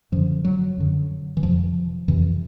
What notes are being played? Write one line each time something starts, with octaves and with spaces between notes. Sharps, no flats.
F#2 D3 F3
F#3
F#2 D3
E3
F2 C3 F3
F2 C3 E3